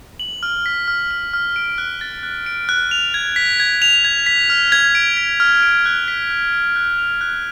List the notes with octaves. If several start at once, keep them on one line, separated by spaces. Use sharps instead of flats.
F#7
F6
B6
F6
F#7
F6
D7
F#6
A6
F#6
D7
F#6
F7
G#6
B6
G#6
F7
G#6
B6
F6
G#6
D7
B6
F6
D7
F#6
B6
F#6
D7
F#6
F7
F#6